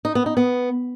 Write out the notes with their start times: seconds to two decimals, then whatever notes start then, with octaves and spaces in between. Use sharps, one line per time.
0.05 D#4
0.15 B3
0.26 D#4
0.37 B3